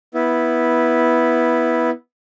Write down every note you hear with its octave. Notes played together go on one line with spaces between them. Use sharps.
B3 E4